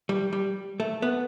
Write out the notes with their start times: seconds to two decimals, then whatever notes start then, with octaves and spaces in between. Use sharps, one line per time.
0.09 G3
0.33 G3
0.80 A3
1.02 B3